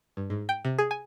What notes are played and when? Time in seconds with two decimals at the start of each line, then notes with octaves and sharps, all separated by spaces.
0.17 G2
0.30 G#2
0.49 G5
0.65 C3
0.78 G#4
0.91 G#5